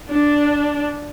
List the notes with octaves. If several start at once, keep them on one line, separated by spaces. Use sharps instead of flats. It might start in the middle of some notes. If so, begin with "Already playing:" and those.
D4